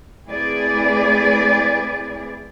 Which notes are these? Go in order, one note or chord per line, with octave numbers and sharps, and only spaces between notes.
A3 C4 E4 G#4 B4 D5